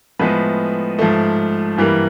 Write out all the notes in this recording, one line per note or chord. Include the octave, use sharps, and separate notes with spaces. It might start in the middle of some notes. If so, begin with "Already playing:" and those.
A2 F3 G#3 B3 B4
G#2 F3 A3
G2 E3 G3 A#3